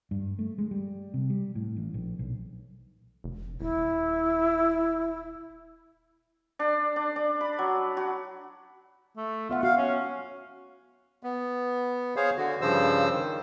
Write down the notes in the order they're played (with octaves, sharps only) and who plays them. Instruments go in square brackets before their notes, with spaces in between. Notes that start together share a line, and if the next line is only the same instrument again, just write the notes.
[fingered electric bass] G2
A3
G#3
G3
C3
G3
A2
A1
A#1
B1
[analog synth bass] F1
[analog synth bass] D#1 [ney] E4
[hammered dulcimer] D4
D4
D4
B5
F#3
F#4
[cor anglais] A3
[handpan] B3 E5 F#5 [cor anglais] F4
[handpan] F#4 [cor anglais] F5
[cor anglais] C#4
[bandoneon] B3
G#4 C5 C#5 F5
D3 F#4
G2 C#3 F3 C5 E6
D#3